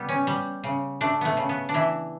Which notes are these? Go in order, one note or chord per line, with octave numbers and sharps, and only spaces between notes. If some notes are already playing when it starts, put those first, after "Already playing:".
Already playing: C#3 G3 B3
C#4
G3
C#3
A3 D4
A3 B3
C#3
B3
D4
E3 E4